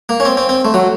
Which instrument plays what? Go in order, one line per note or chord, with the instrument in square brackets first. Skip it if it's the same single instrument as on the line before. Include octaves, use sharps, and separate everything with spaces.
[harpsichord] A#3
C#4
C4
C4
C4
A3
F#3